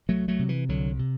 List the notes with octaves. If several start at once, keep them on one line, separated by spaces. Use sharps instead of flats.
C2 F#3 A3
F#3 A3
C3
E3
C2 D3 F#3
C3